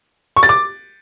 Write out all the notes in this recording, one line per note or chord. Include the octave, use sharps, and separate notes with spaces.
C#6
A6
D6